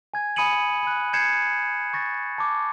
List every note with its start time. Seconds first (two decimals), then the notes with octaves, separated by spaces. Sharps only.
0.14 G#5 G#6
0.36 G#5 B5 D#6 C#7 D#7 F#7
0.83 B5 F#6
1.13 G6 G#6 C7 C#7 E7
1.93 C#6 A6 A#6
2.38 A5 D6